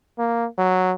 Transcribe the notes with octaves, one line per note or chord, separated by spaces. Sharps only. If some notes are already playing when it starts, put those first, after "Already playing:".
A#3
F#3